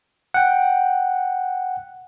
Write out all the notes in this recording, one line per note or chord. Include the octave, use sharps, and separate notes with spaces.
F#5 G5